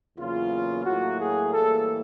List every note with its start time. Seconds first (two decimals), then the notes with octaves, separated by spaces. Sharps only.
0.17 E2 C#3 F#3 A#3 F4
0.86 A2 F#3 A#3 F#4
1.20 G#4
1.53 A2 E3 G3 A#3 A4